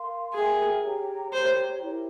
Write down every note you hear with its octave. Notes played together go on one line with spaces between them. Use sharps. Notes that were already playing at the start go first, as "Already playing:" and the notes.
Already playing: A#4 F5 C6
G#4 A#4 E5 G5
G4 C#5 G5 A#5
G4 C5 C#5 G5 A#5
E4 G4 A#4